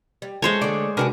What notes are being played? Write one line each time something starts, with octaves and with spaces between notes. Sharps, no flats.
G3
G#3 A3 E4 A4 C5 C#5
D3 A3 D5
C3 D4 F#4 G#4 A#4 B4